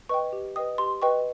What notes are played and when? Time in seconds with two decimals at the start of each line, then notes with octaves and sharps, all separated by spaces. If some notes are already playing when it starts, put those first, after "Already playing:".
0.09 B4 D#5 G5 C#6
0.33 G4
0.56 B4 D#5 G5 D#6
0.78 G4 C6
1.02 B4 D#5 G5 C#6